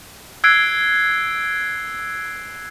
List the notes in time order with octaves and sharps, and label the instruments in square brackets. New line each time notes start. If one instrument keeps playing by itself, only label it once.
[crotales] E6 F#6 G#6 C7 D7